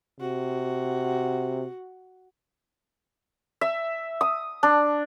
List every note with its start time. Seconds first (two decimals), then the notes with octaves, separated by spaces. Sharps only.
0.20 C3 F#4
3.61 E5
4.21 D#6
4.63 D4